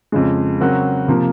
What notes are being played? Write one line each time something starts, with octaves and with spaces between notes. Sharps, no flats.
F2 C#3 G#3
C#3 F#3 C4 F#4 A#4
C3 F3 A#3